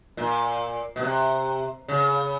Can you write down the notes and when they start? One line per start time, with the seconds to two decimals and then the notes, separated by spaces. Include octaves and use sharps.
0.17 A#2
0.96 B2
1.03 C3
1.88 C#3